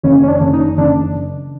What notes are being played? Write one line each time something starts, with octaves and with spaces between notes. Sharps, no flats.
F#1 C#4
C#4
D4
F#1
D#4
F#1 D4